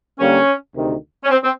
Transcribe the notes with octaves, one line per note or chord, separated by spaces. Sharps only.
D3 G3 A#3 C#4
D2 C3 D#3
C#4
C4
C4